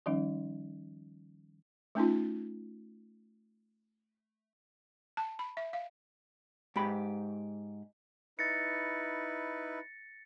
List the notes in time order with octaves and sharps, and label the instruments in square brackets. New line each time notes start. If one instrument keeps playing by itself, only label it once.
[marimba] D#3 F3 G3 C#4 D#4
[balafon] A3 C#4 D#4 F4
A5
B5
E5
F5
[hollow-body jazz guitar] G#2 G4 B5
[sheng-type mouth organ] D#4 E4 B4 [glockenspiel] A6 A#6 C#7